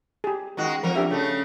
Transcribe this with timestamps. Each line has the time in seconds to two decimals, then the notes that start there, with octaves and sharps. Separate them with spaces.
0.24 G4 G#4
0.57 D#3 G#3 F#4
0.83 F2 F3 A#4
0.96 D4 G4 E5
1.10 C#3 A3